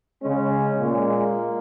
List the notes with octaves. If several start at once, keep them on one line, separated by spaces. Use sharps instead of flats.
C#3 G#3 C#4
A#2 G#3 A#3